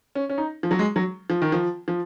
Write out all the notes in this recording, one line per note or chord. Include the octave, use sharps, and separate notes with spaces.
C#4
C#4
D#4
F3
F#3
G#3
F#3
F3
D#3
F3
F3